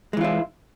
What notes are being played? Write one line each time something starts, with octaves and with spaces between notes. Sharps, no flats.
E3 G#3 E4 F4